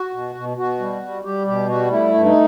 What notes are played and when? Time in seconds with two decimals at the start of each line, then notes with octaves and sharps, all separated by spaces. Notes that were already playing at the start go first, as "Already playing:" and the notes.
Already playing: F#4
0.13 B2
0.35 B2
0.57 B2 F#4
0.80 G3
1.02 G3
1.25 G3 G4
1.47 B2 G4
1.69 G3 F#4
1.91 A3 E4
2.14 G2
2.25 D#4